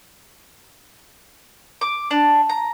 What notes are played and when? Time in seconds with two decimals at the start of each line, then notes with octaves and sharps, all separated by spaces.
1.81 D6
2.11 D4
2.49 A#5